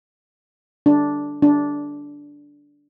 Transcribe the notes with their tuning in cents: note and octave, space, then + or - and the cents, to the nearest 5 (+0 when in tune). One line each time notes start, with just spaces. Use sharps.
D4 -5
D4 -10